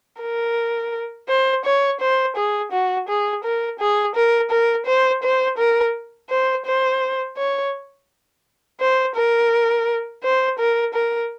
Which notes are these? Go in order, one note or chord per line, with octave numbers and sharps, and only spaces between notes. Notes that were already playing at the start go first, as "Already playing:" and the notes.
A#4
C5
C#5
C5
G#4
F#4
G#4
A#4
G#4
A#4
A#4
C5
C5
A#4
C5
C5
C#5
C5
A#4
C5
A#4
A#4